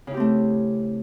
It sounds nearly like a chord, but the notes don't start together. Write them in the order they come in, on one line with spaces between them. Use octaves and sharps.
C#3 E4 G4 C4 A3